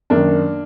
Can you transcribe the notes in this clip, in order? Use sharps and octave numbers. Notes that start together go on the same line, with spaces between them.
F#2 D#3 A#3 D4